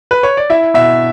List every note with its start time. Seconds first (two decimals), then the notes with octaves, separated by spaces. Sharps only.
0.11 B4
0.23 C#5
0.37 D5
0.50 E4 E5
0.74 B2 E5